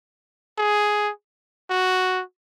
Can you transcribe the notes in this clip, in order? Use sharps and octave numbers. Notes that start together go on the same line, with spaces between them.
G#4
F#4